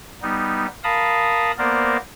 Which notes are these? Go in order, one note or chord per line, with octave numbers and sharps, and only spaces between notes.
G3 B3 D#4
A#4 F5 A5 B5 D#6
A#3 B3 A#4 C5 D5